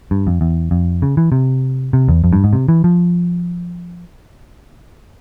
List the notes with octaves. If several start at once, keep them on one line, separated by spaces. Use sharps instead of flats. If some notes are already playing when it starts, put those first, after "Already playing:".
G2
F2
E2
F2
C#3
E3
C3
C3
E2
F2
G2
G#2
C3
E3
F3